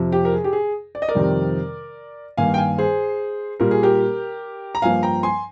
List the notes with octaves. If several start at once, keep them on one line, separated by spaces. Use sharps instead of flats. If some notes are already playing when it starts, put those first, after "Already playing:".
Already playing: F2 C3 F3
G4
A#4
G#4
G4
G#4
D5
D#5
A#4 D5
F2 C3 D#3 G3 C4
G2 D#3 A#3 F5 G#5
G5
F5 G#5
G#4 C5
A#2 G3 A#3 A#4
G#4
G4 A#4
A#5
G2 F3 A#3 F5 G#5
G5 A#5
G#5 C6